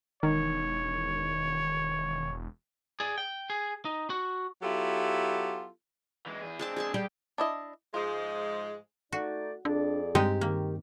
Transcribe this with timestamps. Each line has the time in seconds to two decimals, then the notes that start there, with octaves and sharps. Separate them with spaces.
0.23 E1 D#3 C#5
3.00 G#4 D5
3.18 G5
3.50 G#4
3.85 D#4
4.10 F#4
4.62 F#3 B3 E4 F4 G4 A4
6.26 E3 G#3
6.41 E2 G#4
6.59 G#3 C4 D4 A5 D6
6.77 G#4 G#5 A5
6.94 G3 G4 G#4
7.38 D4 E4 D#5
7.94 G#2 F3 G#3 F4
9.13 A3 D#4 F#4 D5
9.65 F2 D4 G#4 D5
10.15 G2 G#3 C4 D#4 G4
10.41 D#3 A#3